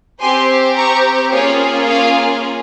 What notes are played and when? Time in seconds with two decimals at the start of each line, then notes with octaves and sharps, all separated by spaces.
0.20 C4 G4 G#5 C6
0.76 A#5 C#6
1.32 A#3 C#4 F4 G#4 C#5 F5
1.89 C#5 F5